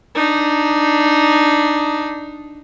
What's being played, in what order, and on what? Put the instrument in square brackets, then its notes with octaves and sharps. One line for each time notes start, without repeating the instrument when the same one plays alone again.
[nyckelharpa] D4 D#4